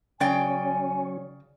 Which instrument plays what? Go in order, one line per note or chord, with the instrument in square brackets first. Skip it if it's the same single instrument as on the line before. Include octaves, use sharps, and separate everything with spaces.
[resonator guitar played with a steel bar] C#3 D5 G5 [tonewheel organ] F#3 C#4 C#5 [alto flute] G#5